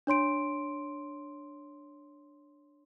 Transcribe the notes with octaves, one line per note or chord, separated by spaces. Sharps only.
D4 C#5 C6 D7